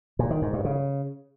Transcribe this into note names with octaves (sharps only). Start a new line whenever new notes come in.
A#2
D#3
G#2
G2
C#3